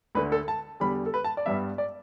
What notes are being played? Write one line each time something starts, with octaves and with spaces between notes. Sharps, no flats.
D2 D3 A3 B4
A4
A5
E2 D3 G3 B5
A4
B4
A5
D5
G2 G3 B3 E5
D5